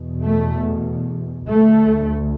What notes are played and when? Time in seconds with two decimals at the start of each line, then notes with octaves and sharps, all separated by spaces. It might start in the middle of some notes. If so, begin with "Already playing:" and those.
Already playing: E2 B2
0.25 A3
1.49 D2 A3